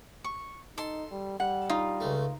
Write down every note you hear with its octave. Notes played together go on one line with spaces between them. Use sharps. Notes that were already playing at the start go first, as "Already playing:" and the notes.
C#6
D#4 A4 C6
G3
G3 F#5
D#4 F4
C#2 A3